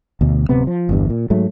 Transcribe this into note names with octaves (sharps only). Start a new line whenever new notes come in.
D2 B2
D1 C3 B3
F3
G1 E2 G2
A#2
G#2 F#3 A3